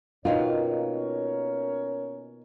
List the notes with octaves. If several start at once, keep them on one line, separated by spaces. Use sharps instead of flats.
B2 D#3 A#3 C#4 F4 A#4 C#5